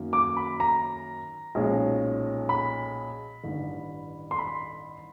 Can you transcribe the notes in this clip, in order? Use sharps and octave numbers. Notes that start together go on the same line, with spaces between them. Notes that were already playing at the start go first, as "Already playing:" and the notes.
Already playing: F#2 D#3 F#3 A#3
D6
B5
A#5
B1 A#2 F3 G#3 C#4
B5
A1 G2 D#3
C6
B5